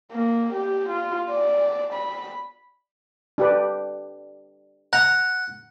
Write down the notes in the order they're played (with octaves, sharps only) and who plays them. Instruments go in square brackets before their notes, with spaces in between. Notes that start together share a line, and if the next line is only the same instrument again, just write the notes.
[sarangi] A#3
G4
F4
D5
B5
[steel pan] D4 G4 B4
[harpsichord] F#5 [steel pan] A#5